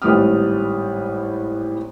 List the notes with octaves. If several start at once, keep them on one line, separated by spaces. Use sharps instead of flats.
G#1 A2 G3 B4 D#6 F6